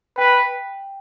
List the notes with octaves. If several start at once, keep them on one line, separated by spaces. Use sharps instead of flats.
B4 G5